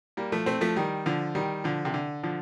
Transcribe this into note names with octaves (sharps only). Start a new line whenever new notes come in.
G3 A#3
F3 A3
A3 C4
F3 A3
D#3 G3
D3 F3
D#3 G3
D3 F3
C3
D3
D3 F3